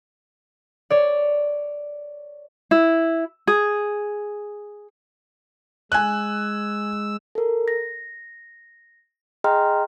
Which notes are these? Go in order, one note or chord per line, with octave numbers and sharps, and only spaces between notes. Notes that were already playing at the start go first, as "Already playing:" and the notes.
C#5 D5
E4
G#4
G#3 G#5 E6 F#6
A4 A#4
A#6
G#4 D#5 G5 A#5 C6 F6